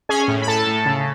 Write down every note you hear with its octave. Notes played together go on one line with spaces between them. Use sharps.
C#4 G#4 G#5
A2
B5
A2 A4 A5
A2
C#3